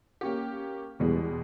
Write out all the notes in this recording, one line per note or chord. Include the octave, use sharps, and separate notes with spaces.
A#3 C#4 G4
E2 B2 G3 G#3